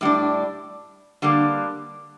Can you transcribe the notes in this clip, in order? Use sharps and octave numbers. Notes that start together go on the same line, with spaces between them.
A2 G3 D4
D3 G3 A#3